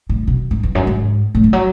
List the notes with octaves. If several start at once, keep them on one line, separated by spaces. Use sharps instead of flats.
A2
B2
G#2
E2
F#2
G#2
A2
E3
F#3